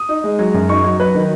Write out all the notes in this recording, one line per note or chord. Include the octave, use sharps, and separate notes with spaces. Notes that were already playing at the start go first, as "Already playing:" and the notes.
Already playing: D#6
D#4
G#3
F#3
F#2
D#4 C#6
F#3
F#3 B4
D#3